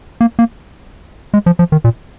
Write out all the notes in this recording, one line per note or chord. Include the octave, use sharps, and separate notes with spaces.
A#3
A#3
G#3
F3
F3
D#3
A#2